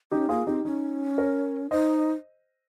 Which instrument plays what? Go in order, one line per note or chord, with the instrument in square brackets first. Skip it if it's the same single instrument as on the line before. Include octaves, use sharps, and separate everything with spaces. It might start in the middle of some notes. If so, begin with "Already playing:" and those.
[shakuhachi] C#4 [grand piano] D#4 G4
[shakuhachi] A#3 [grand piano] F4 G#4
[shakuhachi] C4 [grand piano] D#4 G4
[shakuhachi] C#4 [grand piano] D#4
[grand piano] A#4 C#5
[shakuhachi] D#4 [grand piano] C5 D#5